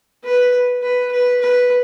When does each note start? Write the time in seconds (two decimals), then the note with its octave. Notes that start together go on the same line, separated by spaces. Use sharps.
0.24 B4
0.82 B4
1.11 B4
1.41 B4